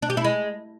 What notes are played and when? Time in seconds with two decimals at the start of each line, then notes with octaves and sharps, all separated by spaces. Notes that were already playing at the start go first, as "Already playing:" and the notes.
0.02 D4
0.10 G4
0.17 E4
0.24 G#3